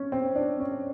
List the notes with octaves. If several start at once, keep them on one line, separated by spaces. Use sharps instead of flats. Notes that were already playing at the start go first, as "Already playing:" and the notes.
Already playing: C#4
C4
D4
C#4